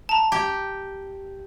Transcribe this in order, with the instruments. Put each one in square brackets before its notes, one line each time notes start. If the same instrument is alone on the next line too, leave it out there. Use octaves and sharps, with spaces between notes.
[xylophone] A5 A#5
[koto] G4